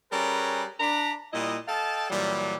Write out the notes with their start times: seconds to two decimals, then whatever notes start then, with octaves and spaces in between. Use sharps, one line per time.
0.12 G3 C#4 G#4 A#4 B4 A#5
0.80 D4 A#5 B5
1.33 A#2 G3 E4 D#5
1.67 A4 D#5 F5 G5 A5
2.10 A#2 E3 F#3 G3